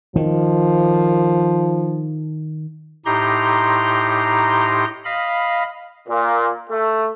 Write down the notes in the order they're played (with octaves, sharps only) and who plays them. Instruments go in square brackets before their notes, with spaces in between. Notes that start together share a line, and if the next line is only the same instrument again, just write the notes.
[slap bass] D#3 [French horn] F3
[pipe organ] A2 D#4 G4 A#5 C6
D#5 F5 B5
[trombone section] A#2
A3